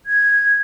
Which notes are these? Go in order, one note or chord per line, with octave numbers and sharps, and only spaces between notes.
G#6